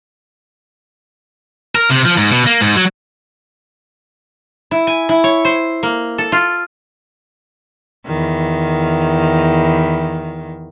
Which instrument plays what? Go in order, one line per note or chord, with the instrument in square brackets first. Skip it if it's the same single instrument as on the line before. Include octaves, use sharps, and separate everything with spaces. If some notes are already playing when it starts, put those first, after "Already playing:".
[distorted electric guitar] A#4
C3
F3
G#2
B2
A#3
G#2
F#3
[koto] E4
G#5
E4
C#5
C5
A#3
A4
F4
[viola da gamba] E2 D#3